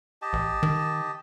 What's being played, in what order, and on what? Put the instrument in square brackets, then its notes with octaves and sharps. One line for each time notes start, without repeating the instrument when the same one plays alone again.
[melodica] G4 D#5 A5
[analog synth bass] A1
D#3